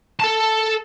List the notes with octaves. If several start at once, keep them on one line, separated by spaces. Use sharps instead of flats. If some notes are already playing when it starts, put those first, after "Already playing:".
A4 A5